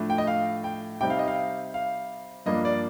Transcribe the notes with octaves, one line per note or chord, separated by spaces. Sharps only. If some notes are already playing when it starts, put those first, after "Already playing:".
Already playing: A2 F3 A3 D4
G5
D#5
F5
G5
C3 G3 C4 D#4 G5
F5
D#5
F5
F5
G2 F3 A#3 D4 D#5
D5